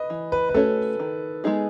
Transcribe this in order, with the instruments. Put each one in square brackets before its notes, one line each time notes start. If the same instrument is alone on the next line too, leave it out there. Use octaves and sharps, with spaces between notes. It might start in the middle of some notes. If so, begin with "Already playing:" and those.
Already playing: [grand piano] B4 D#5
[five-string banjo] E3
[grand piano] B4
B4
[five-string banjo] A3 C#4 F#4 C#5 [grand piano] A4
[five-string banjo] D#3
G#3 B3 D#4 G#4